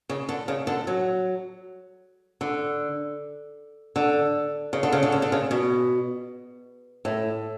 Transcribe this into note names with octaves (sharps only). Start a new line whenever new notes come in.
C#3
D3
C#3
D3
F#3
D3
D3
C#3
D3
C#3
D3
C#3
D3
C#3
B2
A2